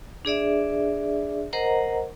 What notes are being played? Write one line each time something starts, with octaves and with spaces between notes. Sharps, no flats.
D4 G#4 D5 E5
A#4 C5 D#5 F#5 A#5